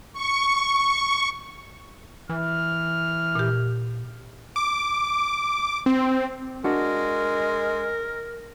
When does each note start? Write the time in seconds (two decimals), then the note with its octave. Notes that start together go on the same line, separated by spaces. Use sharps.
0.13 C#6
2.29 E3 F6
3.35 A#2 G4
4.56 D6
5.86 C4
6.64 G#3 D4 F#4 A#4